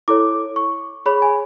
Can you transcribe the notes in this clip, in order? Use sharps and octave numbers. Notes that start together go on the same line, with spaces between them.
E4 A4 C#5 D6
C#6
G#4 C#5 B5
G#5